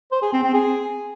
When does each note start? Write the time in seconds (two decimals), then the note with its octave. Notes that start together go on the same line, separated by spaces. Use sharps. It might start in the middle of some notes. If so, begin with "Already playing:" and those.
0.12 C5
0.22 G#4
0.33 C4
0.44 C4
0.54 G#4